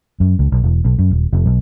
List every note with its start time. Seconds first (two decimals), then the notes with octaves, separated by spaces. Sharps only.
0.20 F#2
0.39 C#2
0.52 B1
0.63 E1
0.85 B1
0.99 F#2
1.11 D#1
1.33 F1
1.46 B1